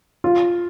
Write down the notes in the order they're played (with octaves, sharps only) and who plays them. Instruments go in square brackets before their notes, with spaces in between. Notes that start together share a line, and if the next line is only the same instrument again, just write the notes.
[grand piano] F4